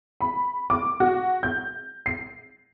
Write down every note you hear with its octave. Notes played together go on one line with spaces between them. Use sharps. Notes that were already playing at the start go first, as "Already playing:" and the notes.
B5
D6
F#4
G6
C7